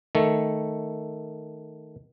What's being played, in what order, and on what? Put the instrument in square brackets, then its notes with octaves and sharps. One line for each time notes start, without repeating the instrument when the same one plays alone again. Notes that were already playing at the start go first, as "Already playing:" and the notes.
[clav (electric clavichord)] D#3 A3